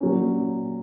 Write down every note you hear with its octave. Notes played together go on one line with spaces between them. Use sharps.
A#2 F#3 A#3 C#4